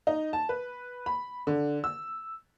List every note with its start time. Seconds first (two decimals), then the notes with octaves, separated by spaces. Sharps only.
0.07 D#4
0.33 A5
0.49 B4
1.06 B5
1.47 D3
1.84 E6